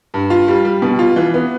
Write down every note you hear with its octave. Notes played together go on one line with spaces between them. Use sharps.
G2
F4
G3
G3
B2
F4
E3
B3